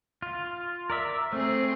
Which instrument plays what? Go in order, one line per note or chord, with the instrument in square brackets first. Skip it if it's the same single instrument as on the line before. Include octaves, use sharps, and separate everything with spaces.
[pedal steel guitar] F4
A#4 D5 E5
[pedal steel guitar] A3 [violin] C4 G#4